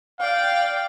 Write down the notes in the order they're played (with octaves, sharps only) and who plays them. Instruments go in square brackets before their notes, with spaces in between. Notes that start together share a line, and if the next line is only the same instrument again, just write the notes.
[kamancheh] D5 G5 [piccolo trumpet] F5